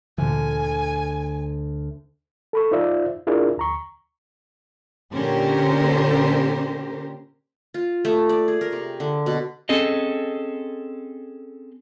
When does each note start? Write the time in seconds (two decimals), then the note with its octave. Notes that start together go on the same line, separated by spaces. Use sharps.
0.18 D2 A#2 D3 E3 G#5
2.53 A4 B5 C#6
2.71 D#4 F4 C5 D5 E5 F5
3.27 D4 E4 F4 G#4 A#4 D5
3.57 D2 A#5 C#6
5.13 A#2 D3 C#4 G4 A#4 C5
7.74 F4
8.05 A3
8.29 D5
8.48 G#4
8.61 A#4
8.72 C3
9.00 D3
9.26 B2
9.69 C4 C#4 G#4 A4 D#5